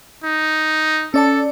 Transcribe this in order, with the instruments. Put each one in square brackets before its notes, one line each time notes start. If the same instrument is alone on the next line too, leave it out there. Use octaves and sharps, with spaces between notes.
[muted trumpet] D#4
[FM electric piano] C#4 D5 A5 [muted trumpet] A4